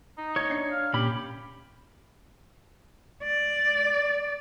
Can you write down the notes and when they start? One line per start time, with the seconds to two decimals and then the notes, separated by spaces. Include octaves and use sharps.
0.18 D#4
0.36 C#5 G#6
0.50 D4 C7
0.72 F5
0.94 A#2 C#4 G4 B5
3.23 D5